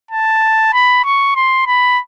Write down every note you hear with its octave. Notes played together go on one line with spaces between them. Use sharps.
A5
B5
C#6
C6
B5